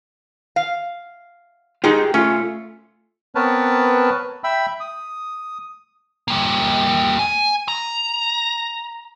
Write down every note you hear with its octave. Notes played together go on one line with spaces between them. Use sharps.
F5
G#3 D#4 F4 G4 G#4
A3 C#4 F4
B3 C4 A#4 B4 C#5 A5
E5 G5 B5 E6
D#6
G3 A#3
G#5
A#5